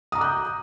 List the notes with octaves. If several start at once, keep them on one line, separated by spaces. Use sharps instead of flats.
A#5 D6 D#6 F#6 G6